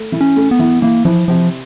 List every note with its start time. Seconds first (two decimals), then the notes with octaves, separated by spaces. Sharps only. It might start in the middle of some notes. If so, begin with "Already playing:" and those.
Already playing: A3
0.12 E3
0.21 C#4
0.36 A3
0.51 B3
0.59 E3
0.82 E3 A#3
1.05 E3 F3
1.28 C3 F3